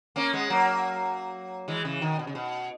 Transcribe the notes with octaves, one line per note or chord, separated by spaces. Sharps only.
A#3 C#4
G#3 B3
F#3 A#3
E3 G#3
C#3 E3
B2 D#3
B2
C#3
B2